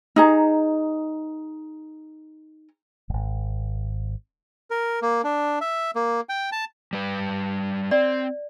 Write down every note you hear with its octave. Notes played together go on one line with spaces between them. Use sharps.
D#4 G#4 A#5
D#1 G#1
A#4
A#3
D4
E5
A#3
G5
A5
G3 B4
C4 D5